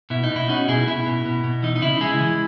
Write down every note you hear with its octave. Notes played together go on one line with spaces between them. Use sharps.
B2 E4
D#4
B2
E4
C#4 D#4 F#4
B2 E4 G#4
B2 E4
B2
B2
B2
E3 D#4
D#4
C#3 E4
G#3 E4 G#4
E3